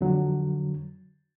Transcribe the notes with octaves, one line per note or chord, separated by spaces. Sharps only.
F2 D3 F#3